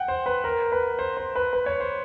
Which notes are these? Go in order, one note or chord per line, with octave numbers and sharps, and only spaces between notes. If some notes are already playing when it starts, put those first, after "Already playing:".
Already playing: F#5 G5
C5
B4
A#4
B4
C5
C5
B4
B4
C#5
C5